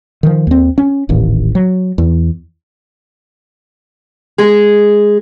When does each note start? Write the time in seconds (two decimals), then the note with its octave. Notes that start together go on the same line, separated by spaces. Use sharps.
0.23 D#3 F3
0.47 D#2 C4
0.78 C#4
1.09 D#1 A1 D#2
1.55 F#3
1.98 E2
4.38 G#3 G#4